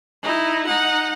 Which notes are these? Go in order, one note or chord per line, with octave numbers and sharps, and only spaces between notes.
D#4 E4
D#4 F#5